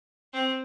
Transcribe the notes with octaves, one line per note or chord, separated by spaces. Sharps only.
C4